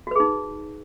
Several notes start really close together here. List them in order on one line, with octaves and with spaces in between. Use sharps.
F#4 B4 G#4 D#4